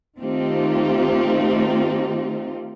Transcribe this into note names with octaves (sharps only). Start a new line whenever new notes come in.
D#3 A3 C4 D#4 F4 G4